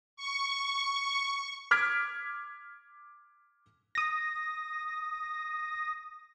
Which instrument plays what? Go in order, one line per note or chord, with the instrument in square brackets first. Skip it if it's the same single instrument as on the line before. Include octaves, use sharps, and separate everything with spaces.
[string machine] C#6
[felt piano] D6 F6 G#6 B6 D7
[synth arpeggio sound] D#6 A#6